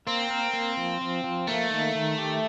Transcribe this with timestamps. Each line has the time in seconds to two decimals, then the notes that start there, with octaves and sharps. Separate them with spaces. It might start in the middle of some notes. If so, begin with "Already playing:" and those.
0.07 A#3 C4
0.30 A#4
0.53 A#3
0.77 F3
1.01 F3
1.24 F3
1.47 A3 A#3
1.71 D#3
1.95 D#3
2.18 G4